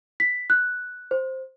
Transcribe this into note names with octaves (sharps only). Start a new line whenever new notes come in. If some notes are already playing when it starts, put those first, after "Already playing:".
B6
F#6
C5